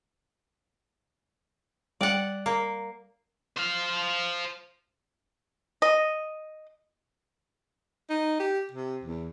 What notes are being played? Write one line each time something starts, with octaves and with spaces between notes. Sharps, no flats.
G3 D5 F#5 G5
A#3
C5 F5
D#5
D#4
G4
C3
E2